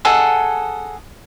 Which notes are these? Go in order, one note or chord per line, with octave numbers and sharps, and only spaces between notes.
G#4 A4 D#5 F#5